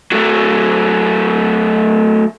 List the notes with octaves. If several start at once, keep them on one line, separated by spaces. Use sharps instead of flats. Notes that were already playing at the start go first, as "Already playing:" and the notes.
F#3 A3